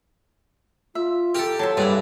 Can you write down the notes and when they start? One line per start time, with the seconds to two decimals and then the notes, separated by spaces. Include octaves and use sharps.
0.95 F4 E5
1.35 G4 A4 A#4
1.59 F#3 C5 C#5 E5 A5 C6
1.77 G2 G3 G#3 E4 D5 F#5